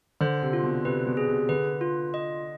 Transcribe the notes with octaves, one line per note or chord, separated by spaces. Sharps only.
D3 C5
C3
F4
B2
C3 B4
B2
G#4
C3
D3 B4
F4
D#5